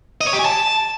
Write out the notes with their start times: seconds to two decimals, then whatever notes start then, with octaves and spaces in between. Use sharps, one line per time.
0.21 D#5
0.27 C#5
0.33 G4
0.39 G#5
0.45 A5